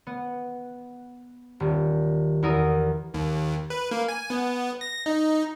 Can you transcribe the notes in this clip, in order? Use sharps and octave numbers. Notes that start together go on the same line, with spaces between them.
B3
D#1
E2 E4 A#4 D#6
D#2
B4
A#3
G#5
B3
A#6
D#4